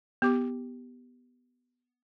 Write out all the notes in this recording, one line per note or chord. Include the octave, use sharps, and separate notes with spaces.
B3 G4 D6